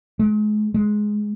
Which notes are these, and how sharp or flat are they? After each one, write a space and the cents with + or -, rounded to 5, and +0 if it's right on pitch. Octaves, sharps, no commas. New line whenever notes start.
G#3 +35
G#3 +10